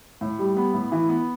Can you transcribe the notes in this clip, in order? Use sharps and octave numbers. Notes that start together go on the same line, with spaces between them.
A2
G3
B3
A2
E3
B3